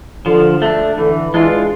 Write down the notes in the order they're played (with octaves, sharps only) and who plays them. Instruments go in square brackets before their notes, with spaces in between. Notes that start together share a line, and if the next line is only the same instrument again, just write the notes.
[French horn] D3 [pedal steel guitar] F3
[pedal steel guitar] A3 D4
[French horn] D3 [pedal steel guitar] E3
[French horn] E3 [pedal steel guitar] G#3 D4 F4